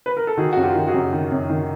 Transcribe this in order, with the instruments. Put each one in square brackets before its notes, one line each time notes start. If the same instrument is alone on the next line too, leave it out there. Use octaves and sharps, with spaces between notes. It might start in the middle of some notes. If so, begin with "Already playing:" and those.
[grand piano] B4
A#4
A4
D#3 F#4 G#4
F#2 F#4
F4 G4
D#3
F#4 G#4
F#2
D#3
F#2
D#3